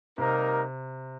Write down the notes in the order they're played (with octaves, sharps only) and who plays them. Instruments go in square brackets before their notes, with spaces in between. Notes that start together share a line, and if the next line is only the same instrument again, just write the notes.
[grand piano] C3 [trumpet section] G3 A#3 D#4 A#4